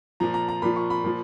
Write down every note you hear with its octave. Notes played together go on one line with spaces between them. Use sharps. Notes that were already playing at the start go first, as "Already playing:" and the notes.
A#2 F3 A#5
A#5
A#5
A#2 F3 B5
C#6
B5
A#2 F3